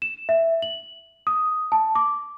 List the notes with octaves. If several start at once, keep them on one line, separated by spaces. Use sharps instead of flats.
E7
E5
F#7
D#6
A5
D6